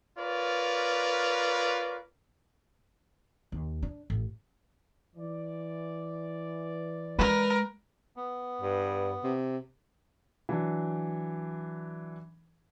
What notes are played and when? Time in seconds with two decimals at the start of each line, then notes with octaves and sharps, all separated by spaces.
0.18 F4 A#4 B4 C#5 D5
3.52 D#2
3.82 D4
4.10 A1
5.16 E3 D5
7.19 G#3 A#4 B4
8.16 B3
8.62 G2
9.23 C3
10.49 E3 F#3 D4